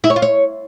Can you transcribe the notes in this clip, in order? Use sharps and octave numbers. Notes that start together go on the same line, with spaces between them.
E4
C#5
F4
C#5